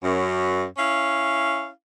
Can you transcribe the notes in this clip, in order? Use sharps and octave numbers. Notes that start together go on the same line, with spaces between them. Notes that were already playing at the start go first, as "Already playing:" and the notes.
F#2
C#4 E4 F5